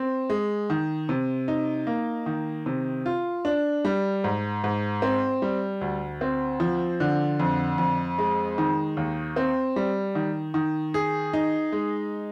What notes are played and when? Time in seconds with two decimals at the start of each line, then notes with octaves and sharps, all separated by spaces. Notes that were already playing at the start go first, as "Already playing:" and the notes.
Already playing: C4
0.30 G#3
0.70 D#3
1.09 C3
1.48 D#4
1.87 A#3
2.26 D#3
2.66 C3
3.06 F4
3.45 D4
3.85 G3
4.24 G#2
4.64 G#2
5.02 C4
5.42 G3
5.81 D2
6.21 C4
6.60 F3
7.00 D3
7.40 F2
7.78 F2
8.18 G#3
8.58 D#3
8.97 D#2
9.36 C4
9.76 G3
10.15 D#3
10.54 D#3
10.94 G#4
11.33 D#4
11.72 G#3